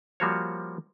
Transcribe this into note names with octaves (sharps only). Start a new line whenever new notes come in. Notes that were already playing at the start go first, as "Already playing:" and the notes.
F3 G3 A#3 F#4 C5 C#5